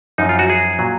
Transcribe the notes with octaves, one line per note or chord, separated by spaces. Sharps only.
F#2 F3 D#4
F4
F#4
G#4
A#2 F#3